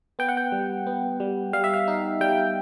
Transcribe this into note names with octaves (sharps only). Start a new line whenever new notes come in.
B3 G5
F#5
G5
G3
B3
G3
G3 F5
E5
F5
D#4
G3 G5